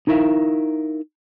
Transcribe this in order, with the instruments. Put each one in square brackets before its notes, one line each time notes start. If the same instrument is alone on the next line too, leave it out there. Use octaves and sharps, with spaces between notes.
[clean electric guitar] D#4 E4 A#4 E5 F5